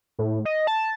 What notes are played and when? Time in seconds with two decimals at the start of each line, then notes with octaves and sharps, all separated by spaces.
0.19 A2
0.45 D#5
0.67 A5